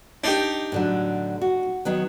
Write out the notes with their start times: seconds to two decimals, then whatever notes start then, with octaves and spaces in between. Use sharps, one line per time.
0.24 D4 D#4 G4
0.72 A2 D3 F#3
1.41 F#4
1.85 D#3 F#3 B3